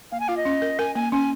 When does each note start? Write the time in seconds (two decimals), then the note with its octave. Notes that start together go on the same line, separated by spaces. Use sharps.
0.12 A#3 F5
0.20 G#5
0.28 F4 F5
0.37 D#5
0.45 C#4
0.62 A#4
0.79 A#4 G#5
0.95 A#3 G#5
1.12 C#4 G#5